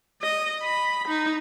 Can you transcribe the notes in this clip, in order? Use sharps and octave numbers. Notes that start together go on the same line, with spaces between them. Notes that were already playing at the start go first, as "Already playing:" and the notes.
D#5
B5
D#4